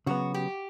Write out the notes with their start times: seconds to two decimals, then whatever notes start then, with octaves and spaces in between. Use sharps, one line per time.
0.06 C#3 F#3 B3 F#4
0.34 G4